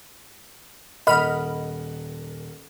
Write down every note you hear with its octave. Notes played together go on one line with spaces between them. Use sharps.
D#1 A#4 D#5 F#5 B5 F6